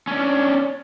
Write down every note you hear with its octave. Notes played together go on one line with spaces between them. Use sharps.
C#4 D4